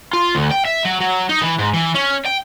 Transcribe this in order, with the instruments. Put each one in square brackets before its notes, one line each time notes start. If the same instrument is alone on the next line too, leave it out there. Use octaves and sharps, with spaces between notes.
[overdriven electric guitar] F4
D2
G5
E5
F#3
F#3
D#4
E3
G#2
E3
C#4
G5